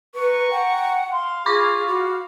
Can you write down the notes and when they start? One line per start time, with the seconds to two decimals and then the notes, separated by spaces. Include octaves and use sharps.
0.15 B4 A#5 C#6
0.51 F#5 G5
1.11 F5 C6
1.46 F4 G#4 B5 C#6 D6
1.88 F#4